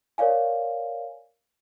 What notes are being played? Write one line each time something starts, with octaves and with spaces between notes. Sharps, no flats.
A#4 C#5 D5 F5 G#5